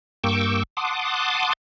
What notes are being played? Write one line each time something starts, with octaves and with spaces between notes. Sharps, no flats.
G2 A#3 G5 C#6 D6 E6
F#5 A5 C6 D6 D#6